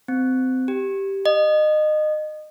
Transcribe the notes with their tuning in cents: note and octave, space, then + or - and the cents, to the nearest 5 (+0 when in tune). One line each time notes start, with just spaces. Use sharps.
C4 -25
G4 -5
D#5 -25